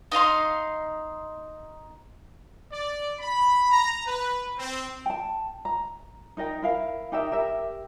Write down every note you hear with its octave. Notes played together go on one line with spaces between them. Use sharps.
D#4 D#5 F5 C6
D5
B5
A#5
B4
C4
G5 A5
A#5
D#4 A#4 D#5 G5
E4 A#4 F5
D#4 G4 A#4 E5
G4 A#4 E5